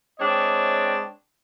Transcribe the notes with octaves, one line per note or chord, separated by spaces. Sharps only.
G#3 C4 D4 C#5 D#5 G5